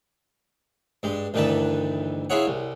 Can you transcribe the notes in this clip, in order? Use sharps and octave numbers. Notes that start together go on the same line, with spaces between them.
G2 G#3
D2 G2 D#3 E3 B4 A5
E4 F4 G#4 C#5 F#5
C2